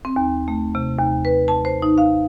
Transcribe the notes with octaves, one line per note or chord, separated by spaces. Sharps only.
C4
D#2
A3
C3
D#2
B4
A5
C5
D#4
F5